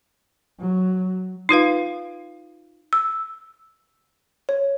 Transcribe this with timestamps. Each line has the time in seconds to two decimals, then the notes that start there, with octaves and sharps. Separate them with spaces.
0.60 F#3
1.49 D#4 F4 B4 F5
2.93 E6
4.49 C#5